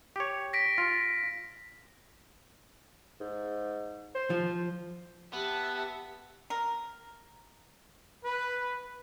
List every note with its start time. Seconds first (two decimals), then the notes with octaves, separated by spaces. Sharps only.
0.16 G4 C#5
0.53 A#6 B6 D7
0.78 F4
3.20 G#2
4.15 C5
4.30 F3
5.33 B3 G4 E5 A5
6.50 A#4
8.24 B4